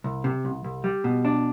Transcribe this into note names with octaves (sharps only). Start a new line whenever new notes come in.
C2
C3
C2
C2
G3
B2
D4